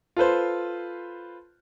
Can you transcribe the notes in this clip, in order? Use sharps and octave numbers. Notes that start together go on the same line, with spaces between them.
F4 A4 B4 C5